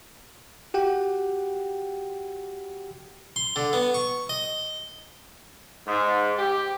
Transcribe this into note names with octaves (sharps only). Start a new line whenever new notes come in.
F#4 G4 F#5 G5
C6
D3
B3
C#6
D#5
G#2
G4